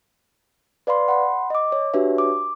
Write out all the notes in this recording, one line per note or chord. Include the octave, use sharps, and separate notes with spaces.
B4 D5 F5 B5 C6
F#5 B5 C6
D#5 D6
C#5
D4 F#4 G4 B4 C#5 E5
D6